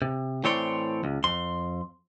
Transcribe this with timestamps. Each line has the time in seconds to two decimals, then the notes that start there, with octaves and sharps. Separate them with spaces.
0.02 C3
0.44 A2 E3 C4 C#5 D5 C6
1.04 C#2
1.24 F2 C6